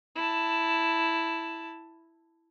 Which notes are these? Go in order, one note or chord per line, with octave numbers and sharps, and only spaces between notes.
E4 A5